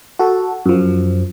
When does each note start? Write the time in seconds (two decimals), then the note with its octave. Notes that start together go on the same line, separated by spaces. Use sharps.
0.19 F#4 A4
0.66 F#2 F3